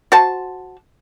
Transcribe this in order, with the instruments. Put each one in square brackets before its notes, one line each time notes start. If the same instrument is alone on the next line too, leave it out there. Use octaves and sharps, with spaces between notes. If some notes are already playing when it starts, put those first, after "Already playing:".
[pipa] F#4 C5 A5